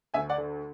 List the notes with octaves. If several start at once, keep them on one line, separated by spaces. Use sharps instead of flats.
D2 E5 G#5
D5 F#5
D3